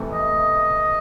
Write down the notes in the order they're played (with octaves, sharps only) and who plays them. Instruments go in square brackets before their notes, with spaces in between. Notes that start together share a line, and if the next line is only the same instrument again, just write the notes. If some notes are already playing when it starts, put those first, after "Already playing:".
Already playing: [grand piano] E2 C3 E3 A3
[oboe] D#5